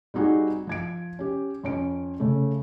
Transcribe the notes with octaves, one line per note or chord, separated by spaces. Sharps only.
G3 C4 D#4 F#4 G#4
F3 G#6 D7
C#4 G4
F2 C#4 D7
C#3 A3